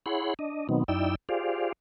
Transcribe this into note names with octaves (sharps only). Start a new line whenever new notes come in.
E4 G#4 C#5 F#5 B5 C6
D4 D#5
B2 D#3 F#3 B3 C4 D#4
F#2 D#4 E4 D5 G5 E6
F4 G4 G#4 C5 D5 F5